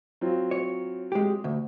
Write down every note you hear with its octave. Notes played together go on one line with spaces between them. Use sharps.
F#3 C4 F4
C#5
G#3 G4
D2